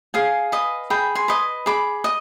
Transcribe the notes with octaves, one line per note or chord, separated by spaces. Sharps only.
G#4 F5 G#5
B4 D#5
G#4 G5 B5
G#5 C6
B4 D#5
G#4 B5 D6
D#5